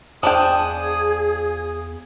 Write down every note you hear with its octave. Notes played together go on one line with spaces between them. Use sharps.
E2 F3 D4 G#4 G5 D#6